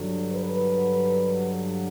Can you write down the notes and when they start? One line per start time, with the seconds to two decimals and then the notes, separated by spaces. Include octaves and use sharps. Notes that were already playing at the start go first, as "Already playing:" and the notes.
Already playing: G2 D3 F#3
0.33 B4